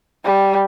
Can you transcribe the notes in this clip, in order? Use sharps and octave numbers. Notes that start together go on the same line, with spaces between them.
G3